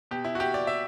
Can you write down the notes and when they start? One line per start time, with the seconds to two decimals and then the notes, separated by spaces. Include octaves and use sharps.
0.11 B2 G4
0.24 E4
0.35 F#4
0.40 G4
0.54 D5
0.67 E5